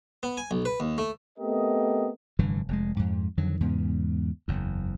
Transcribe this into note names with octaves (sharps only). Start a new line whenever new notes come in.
B3
G#5
B1
B4
D#2
A3
A3 B3 C4 G4 A#4 D#5
F1 G2 D3 E3
F1 A2 G#3
F2 G#2
F2 D3 D#3 F#3
E2 G#2 C#3 B3
F#1 E2